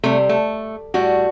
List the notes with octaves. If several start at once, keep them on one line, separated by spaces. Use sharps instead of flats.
C3 G3 A3
A3
A2 G3 F#4